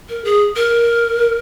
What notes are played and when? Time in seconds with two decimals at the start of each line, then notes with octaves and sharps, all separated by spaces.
0.09 A#4
0.25 G#4
0.56 A#4